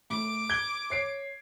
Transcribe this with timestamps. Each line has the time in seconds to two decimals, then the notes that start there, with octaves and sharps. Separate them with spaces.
0.10 A2 D6
0.50 G#6 G7
0.90 C#5 C7 D7